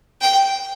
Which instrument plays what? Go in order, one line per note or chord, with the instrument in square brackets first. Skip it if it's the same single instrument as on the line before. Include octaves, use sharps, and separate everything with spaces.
[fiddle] G5